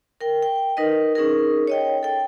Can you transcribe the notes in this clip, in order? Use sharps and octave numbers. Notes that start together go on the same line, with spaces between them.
A#4 G5
G5
D#4 A#4 B4 D#5
C#4 D#4 G#4 A#4
C#5 D#5 G5
A4 G5